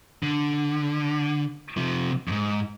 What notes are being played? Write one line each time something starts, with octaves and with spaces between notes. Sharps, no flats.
D3
C3 F3
F2 G#2